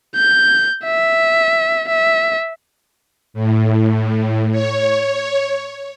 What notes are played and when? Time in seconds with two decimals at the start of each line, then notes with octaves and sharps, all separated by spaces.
0.15 G6
0.85 E5
1.89 E5
3.34 A2
4.52 C#5